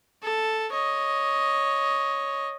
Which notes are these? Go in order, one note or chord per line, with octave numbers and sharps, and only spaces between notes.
A4
C#5 D#5